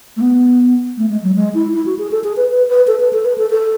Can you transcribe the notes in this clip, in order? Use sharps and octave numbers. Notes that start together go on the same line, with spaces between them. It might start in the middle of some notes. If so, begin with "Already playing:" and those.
A3
B3
A3
G#3
F#3
G#3
E4
E4
F#4
G#4
A4
G#4
B4
B4
B4
A4
B4
A4
B4
A4
A4